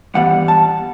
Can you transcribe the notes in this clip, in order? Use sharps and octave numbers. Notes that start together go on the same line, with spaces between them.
G2 E3 G3 B3 F#5
A5